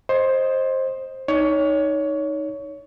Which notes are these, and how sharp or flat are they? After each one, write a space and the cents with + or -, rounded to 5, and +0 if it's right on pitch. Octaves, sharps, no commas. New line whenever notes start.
C5 +15 D#5 +0
D#4 +0 C#5 +20